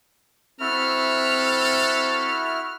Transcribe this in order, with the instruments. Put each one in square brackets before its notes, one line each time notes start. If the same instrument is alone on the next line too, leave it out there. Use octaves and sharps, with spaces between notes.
[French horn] C4 [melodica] E4 F#4 E5 [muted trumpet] A4 [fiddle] F6